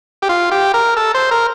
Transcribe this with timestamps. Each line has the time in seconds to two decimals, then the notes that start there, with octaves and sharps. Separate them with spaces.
0.22 G4
0.29 F4
0.51 G4
0.74 A#4
0.97 A4
1.14 C5
1.31 A#4